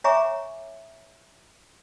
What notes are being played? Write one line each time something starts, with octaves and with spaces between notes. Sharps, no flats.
C#5 E5 G#5 A#5 C#6 D6